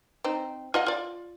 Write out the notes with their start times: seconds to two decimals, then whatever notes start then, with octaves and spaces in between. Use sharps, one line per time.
0.24 C4 D#4
0.74 F4 D#5 F#5
0.86 F4 D5